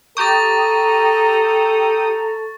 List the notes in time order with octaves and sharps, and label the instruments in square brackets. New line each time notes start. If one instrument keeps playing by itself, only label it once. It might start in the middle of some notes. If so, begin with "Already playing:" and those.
[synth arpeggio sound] G4 G5 D#6 [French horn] A4 [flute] A#5 [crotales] C#6 A6